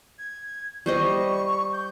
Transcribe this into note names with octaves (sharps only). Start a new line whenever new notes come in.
G#6
G3 C5 D#5 C#6
G6